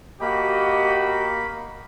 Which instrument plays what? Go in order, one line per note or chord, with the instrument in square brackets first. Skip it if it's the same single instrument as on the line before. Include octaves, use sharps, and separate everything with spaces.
[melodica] A#3 B5 [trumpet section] F#4 G4 D#5